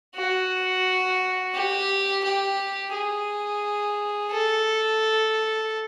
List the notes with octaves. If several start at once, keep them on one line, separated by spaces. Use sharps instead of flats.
F#4
G4
G4
G#4
A4